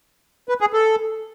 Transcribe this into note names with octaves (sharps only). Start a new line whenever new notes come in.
B4
G#4
A4